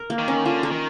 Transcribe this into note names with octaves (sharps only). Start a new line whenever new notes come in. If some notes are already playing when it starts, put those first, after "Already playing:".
Already playing: A#4
A#3
D#3
C#4
D3 F4
A#4
D#3